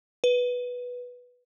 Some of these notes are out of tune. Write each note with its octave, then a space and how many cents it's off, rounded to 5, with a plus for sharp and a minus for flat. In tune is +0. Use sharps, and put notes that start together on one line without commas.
B4 -5